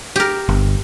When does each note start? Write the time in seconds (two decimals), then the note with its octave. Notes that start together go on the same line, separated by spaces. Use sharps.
0.16 G4 A#4
0.49 G1